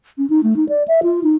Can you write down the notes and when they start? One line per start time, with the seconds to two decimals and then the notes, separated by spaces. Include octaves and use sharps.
0.18 C#4
0.30 D#4
0.43 A3
0.56 D#4
0.69 D5
0.88 E5
1.03 F4
1.23 D#4